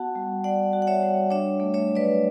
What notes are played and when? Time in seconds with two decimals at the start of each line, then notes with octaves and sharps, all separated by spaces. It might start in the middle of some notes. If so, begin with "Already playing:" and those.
Already playing: B3 F#4 F#5 A5
0.15 G3
0.44 G3 D5 F#5
0.73 F#4
0.82 F#5
0.87 C#5 E5
1.03 G3
1.30 D4 C#5 E5
1.60 A3
1.74 C#5 E5
1.88 F#3
1.95 B4 D5